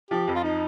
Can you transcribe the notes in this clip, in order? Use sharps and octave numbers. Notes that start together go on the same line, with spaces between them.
F3 G4
F2
F4
D#4